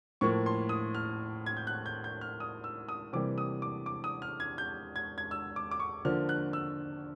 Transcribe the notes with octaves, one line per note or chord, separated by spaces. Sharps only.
A2 F3 A#3 C#6
C6
D#6
F6
G#6
G6
F#6
G6
G6
F6
D#6
E6
D#6
C3 E3 G3 A#3 D6
D#6
D6
D6
D#6
F6
G#6
G6
G#6
G#6
E6
D6
D6
C#6
D3 F3 A#3 F6
F#6
E6